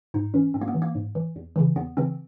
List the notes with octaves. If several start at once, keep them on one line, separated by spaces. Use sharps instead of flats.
G#2 D#4
E3 C#4
G#2 C4
A#3
B3
E3
A#3
G#2
E3
E2
C#3 E3
E2 B3
C#3 E3 C4